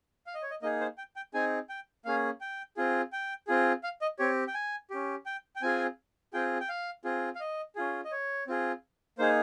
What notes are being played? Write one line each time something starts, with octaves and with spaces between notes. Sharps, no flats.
F5
D#5
C#5
D#5
A#3 D#4 G#4 D#5
C5
G5
G5
C4 D#4 G#4 G#5
G5
A#3 C#4 G#4 F5
G5
C4 F4 G#4
G5
C4 F4 G#4
F5
D#5
C4 G4 C#5
G5
G#5
C#4 G4
G5
G5
C4 F4 G#4 G#5
C4 F4 G#4 G5
G5
F5
C4 F4 G#4
F5
D#5
C#4 F4 G#4
D#5
C#5
C4 F4 G#4
A#3 D#4 G#4 C5